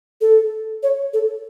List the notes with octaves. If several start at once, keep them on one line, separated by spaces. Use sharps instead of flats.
A4
C#5
A4